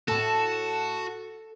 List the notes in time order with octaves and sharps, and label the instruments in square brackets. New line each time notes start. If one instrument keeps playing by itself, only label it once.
[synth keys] A2 A5 E7 [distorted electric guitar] F#4 [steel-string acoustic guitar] A4